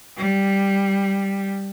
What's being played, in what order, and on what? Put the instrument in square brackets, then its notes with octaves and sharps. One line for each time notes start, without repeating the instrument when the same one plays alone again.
[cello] G3